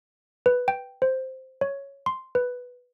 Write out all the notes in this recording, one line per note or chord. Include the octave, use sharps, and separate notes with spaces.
B4
G5
C5
C#5
C6
B4